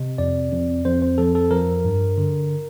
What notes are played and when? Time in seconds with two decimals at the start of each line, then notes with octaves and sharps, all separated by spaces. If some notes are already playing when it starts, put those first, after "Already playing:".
Already playing: C3 D#5
0.18 F2 D5
0.52 F2
0.85 F2 C5
1.02 C5
1.18 F3 A4
1.35 A4
1.51 F3 A#4
1.85 G2
2.18 D3